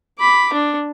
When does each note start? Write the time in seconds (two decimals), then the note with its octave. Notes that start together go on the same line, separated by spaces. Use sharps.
0.19 B5 D6
0.53 D4